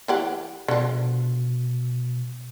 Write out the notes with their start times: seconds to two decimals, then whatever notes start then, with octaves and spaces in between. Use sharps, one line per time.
0.08 E3 G4 F#5
0.68 B2 D3 F3